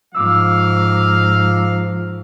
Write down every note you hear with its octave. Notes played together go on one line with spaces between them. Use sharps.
G#2 F3 F5 D6 E6